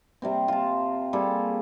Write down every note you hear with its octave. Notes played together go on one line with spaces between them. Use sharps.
C3 G3 C4
F4 A5
G3 A#3 G#4 A4